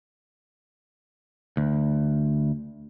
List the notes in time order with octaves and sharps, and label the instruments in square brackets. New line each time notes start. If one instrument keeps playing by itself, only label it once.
[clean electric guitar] D2